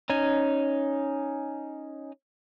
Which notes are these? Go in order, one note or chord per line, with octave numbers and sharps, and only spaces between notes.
C#4 D#4 G#5